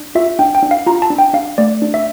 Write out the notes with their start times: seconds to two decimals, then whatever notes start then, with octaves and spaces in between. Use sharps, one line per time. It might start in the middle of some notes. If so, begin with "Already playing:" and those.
Already playing: D4
0.15 F4 E5
0.39 D4 G5
0.55 G5
0.63 D4
0.71 F5
0.86 F4 A#5
1.02 A5
1.10 D4
1.19 G5
1.33 D4 F5
1.58 A3 D5
1.82 D4
1.94 E5